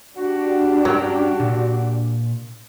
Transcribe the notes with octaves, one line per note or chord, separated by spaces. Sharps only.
D4 F#4 G4
G2 F#3 C#4 G5
A#2